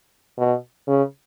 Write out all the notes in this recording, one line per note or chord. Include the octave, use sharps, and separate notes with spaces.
B2
C#3